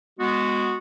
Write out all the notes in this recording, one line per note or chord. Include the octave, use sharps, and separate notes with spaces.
G#3 B3 F#4